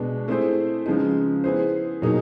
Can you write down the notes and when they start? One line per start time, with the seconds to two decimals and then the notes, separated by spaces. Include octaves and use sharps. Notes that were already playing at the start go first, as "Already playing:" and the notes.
Already playing: B2 G#3 B3 D4
0.28 A3 C4 E4 G#4 C5
0.86 C#3 F3 G#3 B3 D#4
1.44 B3 E4 G#4 C5
2.02 B2 F#3 A#3 D#4 G#4